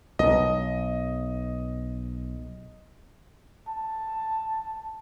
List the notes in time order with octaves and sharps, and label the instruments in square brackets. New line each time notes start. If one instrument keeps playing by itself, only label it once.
[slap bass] B1 [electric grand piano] D#5
[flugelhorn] A5